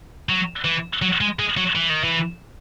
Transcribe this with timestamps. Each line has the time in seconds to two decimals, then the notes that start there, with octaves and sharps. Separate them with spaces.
0.29 F#3
0.65 E3
1.02 F#3
1.21 G#3
1.39 G#3
1.57 F#3
1.76 E3
1.90 D#3
2.04 E3